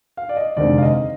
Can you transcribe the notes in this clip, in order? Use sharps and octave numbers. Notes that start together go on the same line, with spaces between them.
F5
D5
D#5
F1 D#2 D3 G#3 C4 D5
F5
D#5